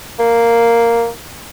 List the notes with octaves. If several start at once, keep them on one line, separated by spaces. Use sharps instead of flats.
A#3